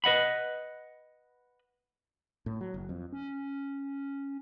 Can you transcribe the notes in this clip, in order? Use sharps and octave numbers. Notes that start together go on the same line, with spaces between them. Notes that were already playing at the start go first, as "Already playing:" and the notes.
B4 D#5 F#5 B5
A2
F#3
F#1
F2
C#4